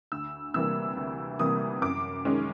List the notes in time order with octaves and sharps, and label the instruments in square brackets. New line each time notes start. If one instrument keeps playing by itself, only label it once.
[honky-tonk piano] D2 E6
C3 E3 G3 A#3 E6
D2
C3 E3 G3 A#3 D#6
F#2 D6
D#3 G#3 C#4